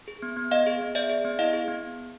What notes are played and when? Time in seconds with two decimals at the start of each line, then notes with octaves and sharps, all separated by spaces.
0.08 G#4
0.22 B3
0.37 B3
0.51 B3 D#5 F5
0.66 G#4
0.81 B3
0.95 G#4 D5 E5
1.09 G#4
1.25 B3
1.39 E4 D#5 F5
1.53 G#4
1.68 B3